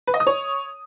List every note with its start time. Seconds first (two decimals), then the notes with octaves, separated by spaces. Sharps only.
0.07 B4
0.14 D#5
0.20 D#6
0.27 C#5